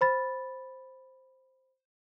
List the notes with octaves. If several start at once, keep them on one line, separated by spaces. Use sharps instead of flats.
C5 B5 A6